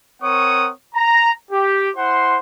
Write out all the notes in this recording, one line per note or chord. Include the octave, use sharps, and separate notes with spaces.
C4 A#4 C#5 F#5 C#6 D#6
A#5
G4
E4 C5 F#5 C6